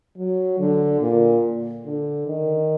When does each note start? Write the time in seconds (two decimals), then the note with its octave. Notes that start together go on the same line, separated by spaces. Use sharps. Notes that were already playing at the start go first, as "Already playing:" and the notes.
0.18 F#3
0.60 D3
1.01 A#2
1.85 D3
2.27 D#3